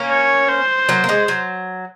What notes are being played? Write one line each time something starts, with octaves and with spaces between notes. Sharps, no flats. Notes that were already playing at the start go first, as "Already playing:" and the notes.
Already playing: A#3 C#4
C#5
C5
F#3 A#3
A#3
G#3
F#3